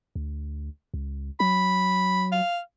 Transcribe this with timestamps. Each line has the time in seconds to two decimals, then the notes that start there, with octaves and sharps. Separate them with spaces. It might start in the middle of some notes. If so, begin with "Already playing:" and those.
0.15 D2
0.94 C#2
1.40 F#3 B5
2.32 F5